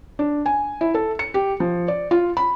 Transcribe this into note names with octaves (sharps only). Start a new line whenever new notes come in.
D4
G#5
E4
A4
C#7
G4
F3
D5
F4
B5